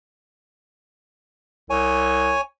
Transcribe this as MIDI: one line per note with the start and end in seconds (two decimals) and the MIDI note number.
1.70 2.35 36
1.70 2.41 73
1.70 2.41 80